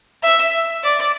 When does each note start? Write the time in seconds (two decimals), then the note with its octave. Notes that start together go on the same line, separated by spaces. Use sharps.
0.23 E5
0.84 D5